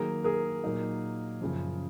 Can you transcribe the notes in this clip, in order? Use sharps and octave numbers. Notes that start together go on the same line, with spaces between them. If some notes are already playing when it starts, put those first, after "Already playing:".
Already playing: D#3 F#3 A#3 G#4 A#4
G#4 A#4
A#2 F#3 A#3 D#4
F#2 C#3 F3